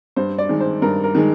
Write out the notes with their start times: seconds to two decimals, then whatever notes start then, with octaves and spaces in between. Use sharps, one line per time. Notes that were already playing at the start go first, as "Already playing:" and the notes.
0.16 G2 C5
0.38 D5
0.49 D#3 G#3
0.60 C5
0.82 G2 A#4
1.04 A#4
1.15 D#3 G#3